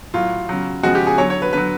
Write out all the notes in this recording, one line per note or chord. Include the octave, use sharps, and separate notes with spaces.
A2 F#3 F4
C#3 F#3
C#3 F3 G#3 F#4
G4
G#4
D3 F#3 C#5
C#5
B4
D3 F#3 B4